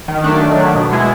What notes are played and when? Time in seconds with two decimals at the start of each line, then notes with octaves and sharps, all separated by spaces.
0.08 D#3
0.24 F#3 A3 D4
0.41 D#3
0.58 F#3 A3 D4
0.75 B2
0.92 G#3 B3 E4 G#4